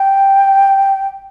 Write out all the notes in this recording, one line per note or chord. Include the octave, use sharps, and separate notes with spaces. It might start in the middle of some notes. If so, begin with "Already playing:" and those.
Already playing: G5